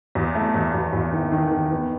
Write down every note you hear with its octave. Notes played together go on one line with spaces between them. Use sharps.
E2
A3
E2
E2
E2
D#3
D#3
D#3
B3